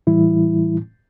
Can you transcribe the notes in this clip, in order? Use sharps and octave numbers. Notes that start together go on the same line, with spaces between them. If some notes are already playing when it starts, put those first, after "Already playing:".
A2 E3 G3 E4